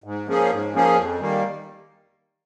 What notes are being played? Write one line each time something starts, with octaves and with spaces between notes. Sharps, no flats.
G#2
F3 A#3 C#4 G#4
G#2
F3 A#3 C#4 G#4
F2
D#3 G3 A#3